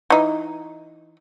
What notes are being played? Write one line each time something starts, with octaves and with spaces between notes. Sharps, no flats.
E3 D#4